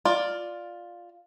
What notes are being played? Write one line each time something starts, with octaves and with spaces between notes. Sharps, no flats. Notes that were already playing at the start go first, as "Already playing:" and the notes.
F4 D5